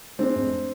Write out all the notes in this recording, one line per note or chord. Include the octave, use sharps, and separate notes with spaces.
G#3 C4 D4
F1